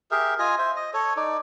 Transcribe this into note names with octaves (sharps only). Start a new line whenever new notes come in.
G4 G#4 A#4 E5
F4 D#5 G#5
C5 E5
D#5
A4 C#5
D#4 D5